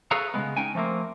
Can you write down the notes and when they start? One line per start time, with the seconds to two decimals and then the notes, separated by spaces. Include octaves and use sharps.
0.11 G#4 A4 B4 C#5 F5 A#5
0.34 C#3 F3 G#3 B3
0.57 C#4 D#4 G5 G#5
0.75 F3 A3 A#3 C4